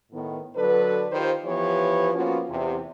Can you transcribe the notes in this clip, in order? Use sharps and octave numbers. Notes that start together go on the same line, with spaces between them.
A2 D#3 B3
D3 F#3 D4 A4 B4
D#3 F4 G4 B4 C5
E3 F3 B3 G4 B4 C#5
F3 A#3 B3 C#4 F4 F#4
E2 C3